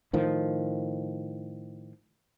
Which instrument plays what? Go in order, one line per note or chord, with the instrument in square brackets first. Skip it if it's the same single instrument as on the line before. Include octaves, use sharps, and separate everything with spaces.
[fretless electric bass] A2 D#3 F3